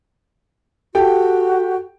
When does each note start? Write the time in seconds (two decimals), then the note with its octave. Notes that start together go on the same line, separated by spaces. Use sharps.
0.95 F#4 G4 A4 G5